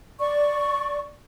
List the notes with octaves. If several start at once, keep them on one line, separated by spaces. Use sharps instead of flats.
D5 C#6